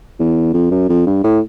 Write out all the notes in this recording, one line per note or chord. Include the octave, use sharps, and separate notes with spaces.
E2
F2
F#2
F2
G2
A2